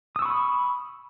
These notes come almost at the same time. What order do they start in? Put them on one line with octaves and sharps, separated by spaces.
D#6 E6 C#6 B5